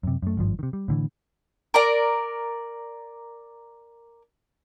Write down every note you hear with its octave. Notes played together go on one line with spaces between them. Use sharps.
F#2 C3
F#2 A3
G#1 G2 F3
C3 D#3
G3
A2 D3 E3
A#4 D5 A#5